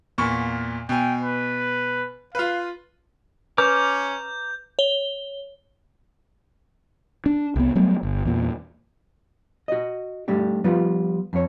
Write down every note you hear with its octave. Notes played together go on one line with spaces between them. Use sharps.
E2 A#2 C#6
B2 G5 G#5
B4
F4 B4 F5
C#4 B4 A#5 D6 F6 G6
C#5 G7
D4
C2 B3
F#3 G3 A3 B3
G1
E2 A#2
F#4 D#5
G3 A3 D4 G4
F3 G3 B3 F4
F2 C#5